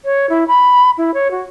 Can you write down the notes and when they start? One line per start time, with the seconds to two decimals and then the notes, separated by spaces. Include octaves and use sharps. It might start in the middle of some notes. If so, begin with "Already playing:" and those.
0.05 C#5
0.29 E4
0.48 B5
0.97 E4
1.14 C#5
1.31 F#4